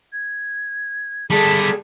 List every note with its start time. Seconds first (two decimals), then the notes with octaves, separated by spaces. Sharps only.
0.13 G#6
1.30 G3 G#4 A4 B6